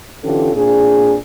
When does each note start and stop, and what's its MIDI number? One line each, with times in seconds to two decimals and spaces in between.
0.23 0.53 50
0.23 0.53 52
0.23 0.53 61
0.23 0.53 65
0.23 0.53 67
0.23 0.53 69
0.54 1.16 46
0.54 1.16 60
0.54 1.16 62
0.54 1.16 68